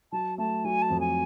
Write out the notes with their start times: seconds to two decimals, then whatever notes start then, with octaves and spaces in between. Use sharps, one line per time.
0.12 F#3 A5
0.38 A3 A5
0.64 F#3 G#5
0.82 A5
0.90 F2
1.00 G#5